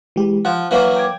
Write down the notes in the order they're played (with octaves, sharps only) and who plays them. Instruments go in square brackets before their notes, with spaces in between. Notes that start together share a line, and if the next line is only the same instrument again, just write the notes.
[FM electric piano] E3 G#3 G4
[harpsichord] F3 [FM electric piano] F#5
[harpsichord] E3 F#3 A#3
[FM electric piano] G5 D6 G#6